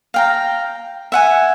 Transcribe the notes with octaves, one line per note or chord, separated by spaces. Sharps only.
F5 G5 A#5
E5 F#5 G#5